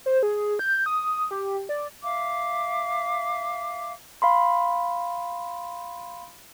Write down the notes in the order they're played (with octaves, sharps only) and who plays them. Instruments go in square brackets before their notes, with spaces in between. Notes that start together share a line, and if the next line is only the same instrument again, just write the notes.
[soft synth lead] C5
G#4
G6
D#6
G4
D5
[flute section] E5 F5 D6
[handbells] F5 B5 C6